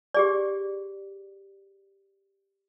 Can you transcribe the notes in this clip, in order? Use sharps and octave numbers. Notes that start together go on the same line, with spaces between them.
G4 G#4 D5